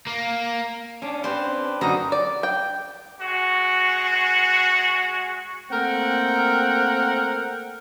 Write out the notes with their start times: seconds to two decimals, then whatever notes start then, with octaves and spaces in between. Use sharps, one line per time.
0.07 A#3
1.02 C#4 D4 F5
1.24 C4 G4 B4 C5
1.81 F#2 D3 C4 D#4 F#4 A#5
2.12 D5
2.43 G5
3.20 G#3 F#4
5.71 A3 A#3 C4 A#4 F#5 G5